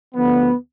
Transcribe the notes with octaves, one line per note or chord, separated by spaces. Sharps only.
D2 D3 F3 B3